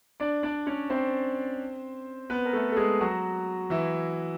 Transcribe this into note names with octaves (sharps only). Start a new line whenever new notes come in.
D4 D5
D4 D5
C#4 C#5
C4 C5
B3 B4
A#4
A3 A4
A4
G#3 G#4
F#3 F#4
E3 E4